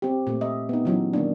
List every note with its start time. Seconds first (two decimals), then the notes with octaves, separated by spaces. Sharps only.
0.02 C4 G4
0.27 A#2 A3
0.41 D#5 E5
0.69 B3 D#4
0.85 E3 F#3 C#4 E4
1.13 D#3 A#3 D4